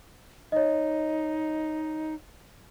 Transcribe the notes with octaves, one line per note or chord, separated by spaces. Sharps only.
D#4 C#5 D#5